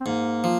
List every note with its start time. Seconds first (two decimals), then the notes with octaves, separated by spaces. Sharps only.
0.01 C4
0.06 G#2 A#3
0.44 F3